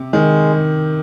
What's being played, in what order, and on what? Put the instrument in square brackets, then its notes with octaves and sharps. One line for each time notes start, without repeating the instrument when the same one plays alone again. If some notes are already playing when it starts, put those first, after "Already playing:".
Already playing: [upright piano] C3
[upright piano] D#3 [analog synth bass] G#3